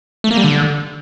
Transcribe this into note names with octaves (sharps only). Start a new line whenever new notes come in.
A3
A#3
G3
D3